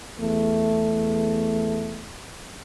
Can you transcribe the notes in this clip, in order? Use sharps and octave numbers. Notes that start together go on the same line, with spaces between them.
E2 A3